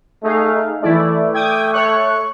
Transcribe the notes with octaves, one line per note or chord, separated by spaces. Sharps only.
A3 D#4 G#4 F5
E3 A3 E4 D5
G5 D6 D#6 G#6
A4 C#5 C#6 F#6